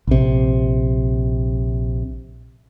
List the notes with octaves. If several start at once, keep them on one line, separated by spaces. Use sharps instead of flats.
A#1 C3